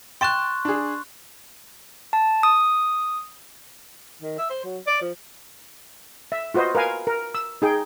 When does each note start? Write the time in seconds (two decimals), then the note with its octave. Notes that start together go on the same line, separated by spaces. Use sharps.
0.21 G5 C6 C#6 F#6 A6 E7
0.65 D4 G#4
2.13 A5
2.43 D#6
4.22 D#3
4.38 E5
4.50 C5
4.64 F#3
4.87 D5
5.01 F3
6.32 E5
6.54 F4 F#4 B4 C5 D#5
6.75 A#4 B4 F5 G#5
7.07 A#4
7.35 E6
7.62 D#4 G#4 G5